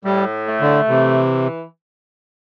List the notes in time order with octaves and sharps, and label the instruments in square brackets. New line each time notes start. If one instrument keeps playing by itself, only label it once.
[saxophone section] A2 [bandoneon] G3
[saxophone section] A3
[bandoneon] D3
[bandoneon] C3 [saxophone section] E3